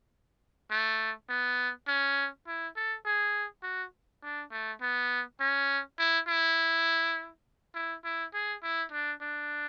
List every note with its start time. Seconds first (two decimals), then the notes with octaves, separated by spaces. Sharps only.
0.70 A3
1.29 B3
1.88 C#4
2.47 E4
2.76 A4
3.06 G#4
3.63 F#4
4.23 D4
4.51 A3
4.81 B3
5.40 C#4
5.99 E4
6.27 E4
7.75 E4
8.04 E4
8.34 G#4
8.63 E4
8.92 D4
9.22 D4